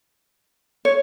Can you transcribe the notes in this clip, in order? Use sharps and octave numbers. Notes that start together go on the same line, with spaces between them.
C#5